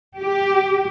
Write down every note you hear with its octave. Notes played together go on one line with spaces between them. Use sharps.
G4